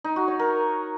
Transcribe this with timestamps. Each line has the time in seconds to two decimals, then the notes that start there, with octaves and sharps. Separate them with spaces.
0.04 D#4
0.16 F#4
0.28 C#5
0.39 A#4